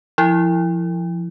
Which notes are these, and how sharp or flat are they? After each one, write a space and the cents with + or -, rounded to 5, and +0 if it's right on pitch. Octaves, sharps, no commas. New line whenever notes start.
F3 -15 E4 +0